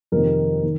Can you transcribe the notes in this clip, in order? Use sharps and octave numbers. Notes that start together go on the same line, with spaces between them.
F2 C3 D#3 A#4
D#3